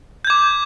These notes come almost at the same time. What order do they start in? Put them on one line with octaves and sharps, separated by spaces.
G6 G#6 D6